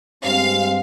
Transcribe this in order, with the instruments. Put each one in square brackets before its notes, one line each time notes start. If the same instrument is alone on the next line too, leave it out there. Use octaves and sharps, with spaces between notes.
[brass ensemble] G2 G#3 C4 [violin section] F5